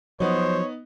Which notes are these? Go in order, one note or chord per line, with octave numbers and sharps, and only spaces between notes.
F3 F#3 B3 D#4 C5 C#5